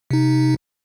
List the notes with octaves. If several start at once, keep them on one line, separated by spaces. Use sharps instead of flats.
C3 D#4